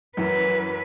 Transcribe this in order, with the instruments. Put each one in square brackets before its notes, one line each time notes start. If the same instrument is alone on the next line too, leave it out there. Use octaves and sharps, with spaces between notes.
[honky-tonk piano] F#2 E3 [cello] B4